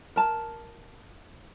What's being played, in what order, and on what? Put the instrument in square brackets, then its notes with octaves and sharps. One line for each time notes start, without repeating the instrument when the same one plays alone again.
[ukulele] A#4 A5